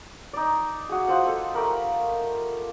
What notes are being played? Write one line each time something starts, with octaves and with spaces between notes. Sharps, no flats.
D#4 D5
F#4 G#4
F4 C5 D#5 F#5
A4 A5
A3 G4 A#4 B5